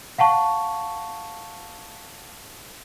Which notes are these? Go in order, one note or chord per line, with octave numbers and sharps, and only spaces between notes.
F5 F#5 A5 C#6